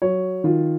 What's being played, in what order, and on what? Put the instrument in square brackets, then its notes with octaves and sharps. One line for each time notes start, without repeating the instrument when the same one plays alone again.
[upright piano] F#3 C#5
D#3 F4